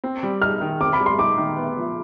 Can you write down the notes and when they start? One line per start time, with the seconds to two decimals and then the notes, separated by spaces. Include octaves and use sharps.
0.04 C4
0.23 G3
0.42 D#4 F6
0.61 D#3
0.81 C4 D6
0.93 B5
1.00 G3
1.06 C6
1.19 D#4 D6
1.38 D#3
1.57 B3
1.77 F3